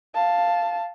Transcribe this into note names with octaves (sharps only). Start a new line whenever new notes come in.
F5 A5